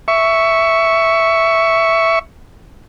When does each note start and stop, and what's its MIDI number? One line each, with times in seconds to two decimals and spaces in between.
0.08 2.19 76
0.08 2.19 85